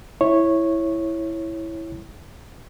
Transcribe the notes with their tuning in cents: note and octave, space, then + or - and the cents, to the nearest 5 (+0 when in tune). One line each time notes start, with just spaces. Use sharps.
E4 +0 C#5 -10